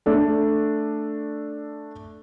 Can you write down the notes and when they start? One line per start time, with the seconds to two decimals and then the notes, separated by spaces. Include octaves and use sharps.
0.06 A3 D4 A4